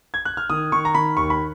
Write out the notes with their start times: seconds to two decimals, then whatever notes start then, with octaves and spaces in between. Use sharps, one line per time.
0.14 G#6
0.25 F#6
0.37 F6
0.50 D#3 D#6
0.72 D#3 C#6
0.85 A#5
0.94 D#3 B5
1.17 D#2 C#6
1.30 B5